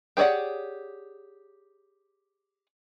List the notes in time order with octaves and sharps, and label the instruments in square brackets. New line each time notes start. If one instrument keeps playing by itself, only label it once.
[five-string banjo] G4 G#4 C#5 D5 F#5